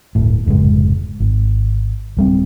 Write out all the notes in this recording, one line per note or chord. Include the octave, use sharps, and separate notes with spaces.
D1 G1 A2
F1 C#2 G#2 G#3
G#1
D1 G3 C4